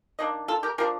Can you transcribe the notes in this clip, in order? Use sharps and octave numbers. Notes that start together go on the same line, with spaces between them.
D#3 A#3 D4 D#5
F4 A4
G4 A#4
F3 A#3 D4 G4 A#4